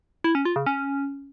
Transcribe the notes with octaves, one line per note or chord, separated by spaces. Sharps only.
E4
C#4
F4
C#3
C#4